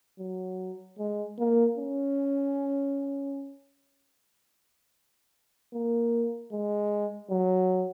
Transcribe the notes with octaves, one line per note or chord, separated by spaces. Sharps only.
F#3
G#3
A#3
C#4
A#3
G#3
F#3